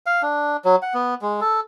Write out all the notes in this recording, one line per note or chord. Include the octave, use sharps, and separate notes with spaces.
F5
D4
F#3
F#5
B3
G#3
A4